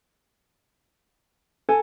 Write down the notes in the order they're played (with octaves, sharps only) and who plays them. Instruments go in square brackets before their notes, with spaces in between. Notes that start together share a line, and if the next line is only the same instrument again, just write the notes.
[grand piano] A4 [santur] G#5